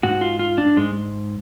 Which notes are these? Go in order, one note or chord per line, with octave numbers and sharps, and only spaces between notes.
G#2 F#4
F4
F4
D4
G#2 G#3